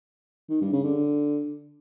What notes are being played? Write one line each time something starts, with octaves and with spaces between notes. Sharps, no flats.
D#3
G2
C#3
D3